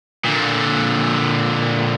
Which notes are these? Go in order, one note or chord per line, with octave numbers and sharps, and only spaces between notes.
A#2 D3